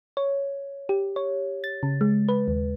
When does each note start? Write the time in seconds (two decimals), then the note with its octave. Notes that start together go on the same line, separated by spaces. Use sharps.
0.17 C#5
0.89 G4
1.16 C#5
1.64 A6
1.83 C#3
2.01 G#3
2.29 B4
2.48 D#2